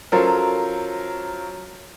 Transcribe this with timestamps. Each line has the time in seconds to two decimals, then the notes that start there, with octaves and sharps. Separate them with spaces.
0.12 F#3 C#4 F4 A4 A#4 C5